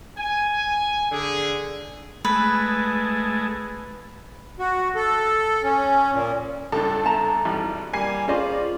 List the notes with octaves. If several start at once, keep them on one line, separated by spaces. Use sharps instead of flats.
G#5
D3 G#4
G#3 A3 B4
F#4
A4
C#4
A#2
C#2 G2 A4
E5 A5 A#5
G#1 E3 G3
G3 A#3 G#5 C7
C#4 F4 G#4 C5 D5 D#5